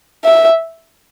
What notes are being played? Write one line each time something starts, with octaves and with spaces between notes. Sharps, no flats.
E5